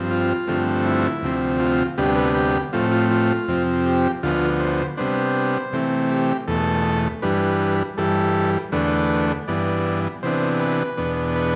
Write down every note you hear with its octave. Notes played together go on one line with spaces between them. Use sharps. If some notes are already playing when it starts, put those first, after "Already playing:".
Already playing: G2 F3 C4
F4
G2 D3 F3 A3 C4
E4
D2 C3 F3 C4
F4
D2 C3 G3 B3 D4 G4
B4
G4
A2 F3 A3 C4 F4
F4
F4
F2 C3 F3 C4
G4
D2 D3 F3 B3 F4
C5
C3 G3 B3 D4 C5
C3 E3 A3 C4
G4
E2 B2 A3 A4
G2 E3 G3 D4 B4
G2 E3 G3 A4
E2 D3 A3 D4 B4
G2 E3 B3 D5
C3 E3 B3 D4 C5
B4
E2 B2 B3 D4
B4